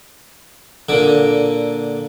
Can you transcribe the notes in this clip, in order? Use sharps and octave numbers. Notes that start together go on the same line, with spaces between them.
A#2 D3